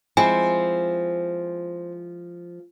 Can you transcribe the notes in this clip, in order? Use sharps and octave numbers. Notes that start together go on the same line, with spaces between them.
F3 G#3 C4 E4 G#5